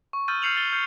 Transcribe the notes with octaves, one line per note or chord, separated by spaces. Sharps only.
C#6
E6 F6 G6 A6 D#7
F6 G6 C7 C#7 F7 F#7
A6 D#7 G7
F6 G6 C7 C#7